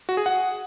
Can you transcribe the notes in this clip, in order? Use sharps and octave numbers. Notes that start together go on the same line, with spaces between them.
F#4
G#4
F#5